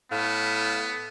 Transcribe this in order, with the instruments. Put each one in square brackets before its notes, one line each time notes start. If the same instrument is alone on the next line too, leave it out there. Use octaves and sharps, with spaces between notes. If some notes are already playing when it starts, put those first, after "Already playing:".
[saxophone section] A2 F5 [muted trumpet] B3